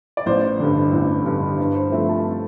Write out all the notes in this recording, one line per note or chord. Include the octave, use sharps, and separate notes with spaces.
D5
A1 C5
G2 D3
A1
G2 D3
G2 B4
C5
F3 A3 C4 E5
A5